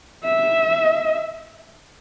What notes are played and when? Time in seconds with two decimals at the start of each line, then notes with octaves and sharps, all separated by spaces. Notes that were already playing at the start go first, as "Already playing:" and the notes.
0.25 E5